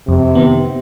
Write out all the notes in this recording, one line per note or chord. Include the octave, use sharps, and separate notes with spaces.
F2 C3
D#3 B3